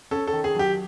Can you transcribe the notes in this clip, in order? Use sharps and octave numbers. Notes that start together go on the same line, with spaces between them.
C#4 A4
A4
D#3
G#4
F#3 G4